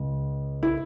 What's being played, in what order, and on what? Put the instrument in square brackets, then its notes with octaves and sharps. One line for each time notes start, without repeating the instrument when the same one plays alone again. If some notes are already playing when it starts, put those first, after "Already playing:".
Already playing: [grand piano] C#2
E4